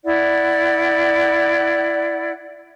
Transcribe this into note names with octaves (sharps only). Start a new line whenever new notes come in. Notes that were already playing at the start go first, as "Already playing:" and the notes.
E4 D5 F#5